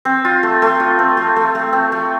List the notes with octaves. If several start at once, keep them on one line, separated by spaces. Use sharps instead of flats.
C4
F4
A3
A3
F4
C4
A3
A3
A3
C4
A3